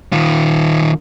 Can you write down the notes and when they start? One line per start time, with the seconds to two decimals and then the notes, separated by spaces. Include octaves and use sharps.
0.13 D#3 F4